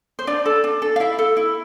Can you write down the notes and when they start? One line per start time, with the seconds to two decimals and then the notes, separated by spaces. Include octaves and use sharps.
0.19 C5
0.27 D4 D5
0.46 A4
0.64 D4
0.82 A4
0.96 F5
1.00 E4 E5
1.19 A4
1.37 E4